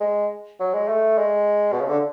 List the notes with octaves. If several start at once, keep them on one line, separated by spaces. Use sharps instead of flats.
G#3
F#3
G#3
A3
G#3
B2
C#3
D3